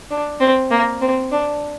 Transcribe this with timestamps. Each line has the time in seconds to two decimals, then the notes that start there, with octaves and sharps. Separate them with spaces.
0.10 D4
0.40 C4
0.71 A#3
1.01 C4
1.32 D4